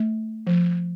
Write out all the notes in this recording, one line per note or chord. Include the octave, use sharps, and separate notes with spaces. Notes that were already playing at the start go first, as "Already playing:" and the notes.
Already playing: A3
F3